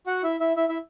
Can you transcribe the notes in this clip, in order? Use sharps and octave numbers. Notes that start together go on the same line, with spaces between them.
F#4 F#5
E4 E5
E4 E5
E4 E5
E4 E5